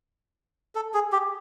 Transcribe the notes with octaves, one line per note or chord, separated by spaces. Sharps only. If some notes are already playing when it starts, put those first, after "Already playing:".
A4
G#4
G4